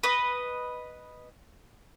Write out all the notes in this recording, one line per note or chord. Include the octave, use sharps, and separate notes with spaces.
B4 D#5